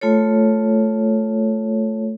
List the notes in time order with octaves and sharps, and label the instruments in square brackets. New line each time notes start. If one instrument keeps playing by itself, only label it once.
[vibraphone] A3 F4 A4 C#5